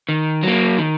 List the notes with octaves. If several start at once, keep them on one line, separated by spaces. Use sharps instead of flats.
D#3
F#3 A#3
D#3